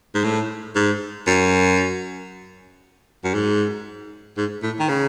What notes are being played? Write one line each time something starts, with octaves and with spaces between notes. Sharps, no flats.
G#2
A2
G#2
F#2
F#2
G#2
G#2
A2
D#3
C#3